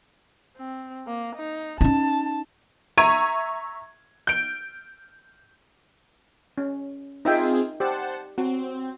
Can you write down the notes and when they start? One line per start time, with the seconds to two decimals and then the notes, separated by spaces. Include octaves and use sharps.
0.57 C4
1.08 A#3
1.36 D#4
1.81 C#4 D#4 A5
2.97 E5 A#5 C#6 G#6 D#7
4.27 G6 D7
6.58 C#4
7.25 C4 D#4 F4 G#4 E5 G5
7.80 G4 C5 F#5 A5
8.38 C4 F#4